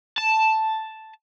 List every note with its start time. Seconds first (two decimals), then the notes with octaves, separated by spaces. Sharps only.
0.18 A5